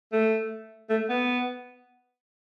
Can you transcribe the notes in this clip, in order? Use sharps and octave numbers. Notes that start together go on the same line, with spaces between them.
A3
A3
B3